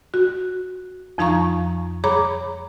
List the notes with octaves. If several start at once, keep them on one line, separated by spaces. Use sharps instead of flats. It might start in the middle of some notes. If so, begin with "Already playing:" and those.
F#4
F2 F3 D#4 F5 A#5 C#6
G#4 C#5 A#5 B5 D6